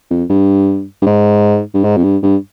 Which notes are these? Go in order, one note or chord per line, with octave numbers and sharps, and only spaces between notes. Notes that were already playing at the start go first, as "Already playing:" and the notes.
F2
G2
G2
G#2
G2
G#2
F2
G2
G2